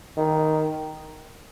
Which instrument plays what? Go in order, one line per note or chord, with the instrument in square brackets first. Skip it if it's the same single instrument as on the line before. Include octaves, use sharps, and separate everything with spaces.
[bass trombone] D#3